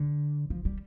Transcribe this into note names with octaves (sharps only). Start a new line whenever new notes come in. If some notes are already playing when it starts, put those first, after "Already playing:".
Already playing: D3
F3
G3